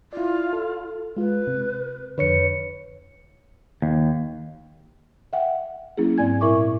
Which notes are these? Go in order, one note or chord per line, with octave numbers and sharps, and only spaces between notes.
E4 F4 D5
A4
G#3 F4 B4
C3
F2 D3 B4 C#5 C#7
D#2
E5 F#5 G5
F#3 A#3 C#4 E4 G#4
G#2 C4 D5 G#5 G#6
A#2 E4 A#4 E5 C#6 D6